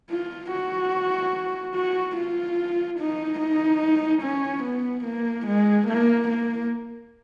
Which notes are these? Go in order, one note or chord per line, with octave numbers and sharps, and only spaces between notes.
F4
F#4
F#4
F4
D#4
D#4
C#4
B3
A#3
G#3
A#3
A#3